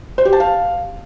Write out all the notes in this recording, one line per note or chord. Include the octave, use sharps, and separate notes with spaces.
C5
G4
A5
F5